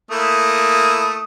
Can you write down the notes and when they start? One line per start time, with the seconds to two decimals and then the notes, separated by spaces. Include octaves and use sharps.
0.11 A3 A#3 E4 D#6